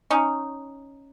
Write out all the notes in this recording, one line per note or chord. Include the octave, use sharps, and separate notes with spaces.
C#4 D#4